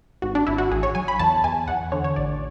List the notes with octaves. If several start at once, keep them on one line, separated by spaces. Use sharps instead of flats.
G#1 F#4
D4
G#1 E4
F#4
A1 G#4
C#5
F#3 G#5
B5
E2 A5
E2 G#5
E2 F#5
D3 C#5
C#5
A1 D5